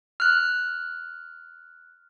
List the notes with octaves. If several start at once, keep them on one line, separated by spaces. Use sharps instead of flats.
F6 F#6